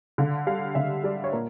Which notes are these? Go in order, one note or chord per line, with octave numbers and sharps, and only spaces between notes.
D3 F5
G3 F5
D3 E5
G3 D5
C#5
A#2 A#4